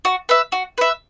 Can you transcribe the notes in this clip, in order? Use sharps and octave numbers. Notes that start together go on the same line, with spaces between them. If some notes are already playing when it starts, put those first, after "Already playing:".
F#4
B4 E5
F#4
B4 E5